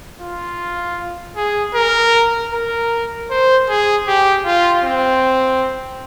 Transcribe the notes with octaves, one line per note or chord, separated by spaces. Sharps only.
F4
G#4
A#4
A#4
C5
G#4
G4
F4
C4